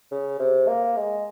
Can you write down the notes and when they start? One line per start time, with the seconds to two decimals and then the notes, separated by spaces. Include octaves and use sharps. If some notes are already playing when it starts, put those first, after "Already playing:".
0.12 C#3
0.39 C3
0.68 A#3
0.97 G#3